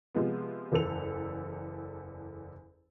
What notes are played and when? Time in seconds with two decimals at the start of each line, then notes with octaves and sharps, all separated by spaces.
0.15 C3 F3 G#3 B3
0.72 F#1 E2 A4 F7